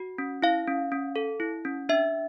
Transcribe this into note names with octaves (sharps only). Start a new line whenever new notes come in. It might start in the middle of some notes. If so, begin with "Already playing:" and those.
Already playing: F#4
C#4
E4 F5
C#4
C#4
A4
E4
C#4
D4 E5